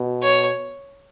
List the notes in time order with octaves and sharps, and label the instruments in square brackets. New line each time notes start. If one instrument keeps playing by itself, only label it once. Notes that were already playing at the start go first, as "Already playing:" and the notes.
Already playing: [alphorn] B2
[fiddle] C#5